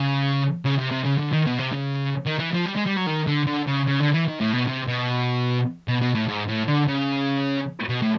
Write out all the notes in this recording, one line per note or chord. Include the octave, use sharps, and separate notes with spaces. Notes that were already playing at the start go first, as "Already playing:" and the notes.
Already playing: C#3
C#3
C3
C3
C#3
D3
D#3
B2
C3
C#3
D#3
E3
F3
G3
G#3
G3
F#3
D#3
D3
D3
C#3
C#3
D3
E3
D#3
A2
B2
C3
B2
B2
B2
A2
G#2
A2
D3
C#3
B2
A2